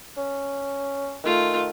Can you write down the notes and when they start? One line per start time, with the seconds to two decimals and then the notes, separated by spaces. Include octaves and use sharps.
0.17 C#4
1.24 D#3 A3 F4